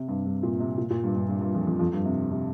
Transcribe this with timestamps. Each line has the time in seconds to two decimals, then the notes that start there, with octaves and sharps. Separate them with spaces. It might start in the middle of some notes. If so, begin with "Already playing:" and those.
Already playing: C3
0.08 G2
0.26 G2
0.43 A#2
0.60 C3
0.78 A#2
0.90 A#2
1.03 G2
1.16 G2
1.28 G2
1.41 G2
1.55 F2
1.67 F2
1.79 F2
1.93 G2
2.05 C3
2.31 C3